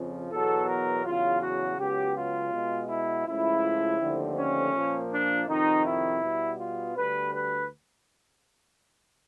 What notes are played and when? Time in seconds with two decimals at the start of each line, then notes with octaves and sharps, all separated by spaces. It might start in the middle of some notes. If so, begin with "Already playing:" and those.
Already playing: F2 C#3 F3
0.31 E2 B2 F#3 B3 A4
0.68 A#4
1.05 E2 C#3 F#3 F4
1.42 F#4
1.78 C#2 C#3 F#3 B3 G4
2.15 F4
2.52 B2 G#3 B3
2.89 E4
3.27 C#2 C#3 F3 A3 E4
4.00 D#2 D3 F3 A3 C4
4.37 C#4
4.74 A#2 F3 A#3
5.11 D4
5.48 F2 C3 D#3 D#4
5.85 E4
6.21 B2 G3 B3
6.58 F4
6.95 D2 D3 G3 B4
7.33 B4